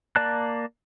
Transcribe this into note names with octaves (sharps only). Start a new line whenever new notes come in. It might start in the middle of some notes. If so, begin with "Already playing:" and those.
A#3 D5 A5 F#6